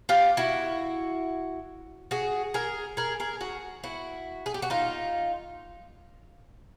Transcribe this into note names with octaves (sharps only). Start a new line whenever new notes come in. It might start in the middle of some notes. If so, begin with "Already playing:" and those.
F4 G4
E4 F#4
F#4 G#4
G#4 A#4
G#4 A#4
G#4 A#4
F#4 G#4
E4 F#4
G#4
G4
F#4
D#4 F4